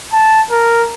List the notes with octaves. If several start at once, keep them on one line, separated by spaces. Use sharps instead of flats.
A5
A#4